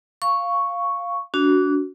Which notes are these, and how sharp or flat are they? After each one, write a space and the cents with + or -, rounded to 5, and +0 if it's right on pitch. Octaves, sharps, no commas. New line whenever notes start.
F5 +0 C#6 +0
D4 -30 F#4 +0